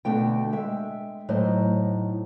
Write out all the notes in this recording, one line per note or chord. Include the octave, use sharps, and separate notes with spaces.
B2 D3 A3 G5
G#3 E5 G5
A2 F#3 D#4 C5 D#5